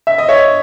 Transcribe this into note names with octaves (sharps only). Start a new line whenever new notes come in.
E5
D#5
C#5 E5